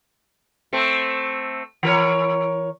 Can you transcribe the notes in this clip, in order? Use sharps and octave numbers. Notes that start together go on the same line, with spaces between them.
A3 C4
E3 A#4 C#5